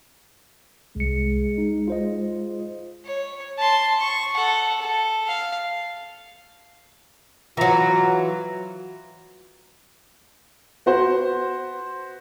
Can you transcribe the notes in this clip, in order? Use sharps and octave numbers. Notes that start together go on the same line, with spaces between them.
C2 G#3 C#7
D#4
F4 C5 D#5
C#5
A5 C6
C#6
A4 F#5
A4
F5
E3 F#3 F4 A#5
B3 F#4 C5